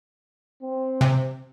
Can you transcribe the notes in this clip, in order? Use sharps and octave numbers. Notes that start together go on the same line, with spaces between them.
C4
C3